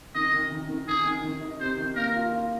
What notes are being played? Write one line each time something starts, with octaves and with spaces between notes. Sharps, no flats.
D#3 D#5
D#3
D#3
D#3
D#3 G#4
D#3
D#3
D#4
C3 C5
D#3
A#3 A#4
F4
F4